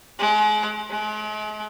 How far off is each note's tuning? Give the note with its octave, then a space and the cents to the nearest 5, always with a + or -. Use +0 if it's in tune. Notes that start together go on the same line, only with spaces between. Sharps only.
G#3 +35
G#3 +45